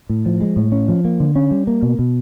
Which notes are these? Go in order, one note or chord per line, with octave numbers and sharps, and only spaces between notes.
A2
F3
G#3
A2
C#4
F3
A#3
D3
C#4
G3
A#3
B2
B2